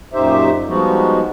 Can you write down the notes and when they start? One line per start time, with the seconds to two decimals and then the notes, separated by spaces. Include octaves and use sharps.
0.13 F#2 A#2 D#4 G4 C5 E5
0.68 F3 G3 G#3 B3 D#4 F#4